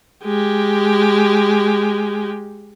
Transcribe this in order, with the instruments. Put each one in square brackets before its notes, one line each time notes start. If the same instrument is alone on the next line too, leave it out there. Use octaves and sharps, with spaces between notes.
[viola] G#3 G4